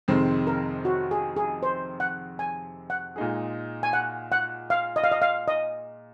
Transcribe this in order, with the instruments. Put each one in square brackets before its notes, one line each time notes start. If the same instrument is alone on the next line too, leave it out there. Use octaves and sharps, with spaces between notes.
[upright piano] F2 C3 D#3 G#3 C4
[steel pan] A#4
F#4
G#4
G#4
C5
F#5
G#5
F#5
[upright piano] A#2 G#3 D#4 G#4
[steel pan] G#5
F#5
F#5
F5
D#5
F5
D#5
F5
D#5